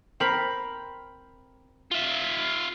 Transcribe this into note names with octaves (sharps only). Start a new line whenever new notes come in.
C4 A#4 B5
F4 E5